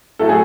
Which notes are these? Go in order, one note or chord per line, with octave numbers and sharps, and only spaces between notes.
A2 F#3 A3 A4
G#4